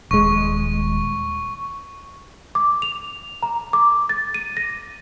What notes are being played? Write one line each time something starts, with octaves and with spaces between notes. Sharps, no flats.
D#1 G#3 C#6
D6
F7
A#5
D6
A6
D#7
A#6